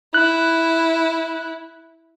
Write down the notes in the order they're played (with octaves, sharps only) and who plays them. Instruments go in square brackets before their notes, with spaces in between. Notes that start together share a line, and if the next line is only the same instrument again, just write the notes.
[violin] E4 [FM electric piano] F#6